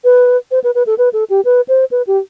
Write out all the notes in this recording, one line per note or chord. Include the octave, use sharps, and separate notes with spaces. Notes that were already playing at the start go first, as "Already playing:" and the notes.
B4
C5
B4
B4
A4
B4
A4
G4
B4
C5
B4
G4